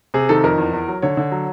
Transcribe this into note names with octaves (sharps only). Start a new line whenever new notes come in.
C3 G#4
D#3 A4
F2 A#4
E2
E2
F#3
D3 C#5
D3
F#3